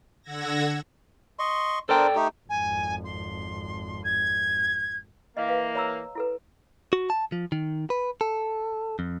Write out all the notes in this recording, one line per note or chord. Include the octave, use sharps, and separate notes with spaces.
D3 F#5 E6 G#6 A#6
D#5 C6 C#6
D4 A4 A#4 C5 D5 G5
A3 D#4 G4
G#1 F2 G#5
C6
G#6
E3 A#3 D#5 F5
B4 F5
C#5 A#5 E6
E4 A4 B4
F#4
A5
F3
D#3
B4
A4
F2